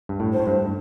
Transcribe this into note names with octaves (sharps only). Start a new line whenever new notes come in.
G2
A2
C5
A2
G2